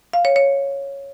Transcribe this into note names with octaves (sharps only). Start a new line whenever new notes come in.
F5
C#5
C#5